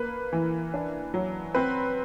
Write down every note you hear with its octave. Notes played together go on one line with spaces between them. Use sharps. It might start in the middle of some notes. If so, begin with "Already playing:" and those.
Already playing: A#3 B4
E3
D4
F#3
C4 B4